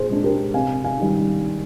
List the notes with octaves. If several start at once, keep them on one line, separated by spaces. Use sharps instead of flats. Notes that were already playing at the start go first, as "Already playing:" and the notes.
Already playing: A#2 G#4 C5
G#3 D4
G4 A#4
C3 F5 G#5
F5 G#5
D#3 G3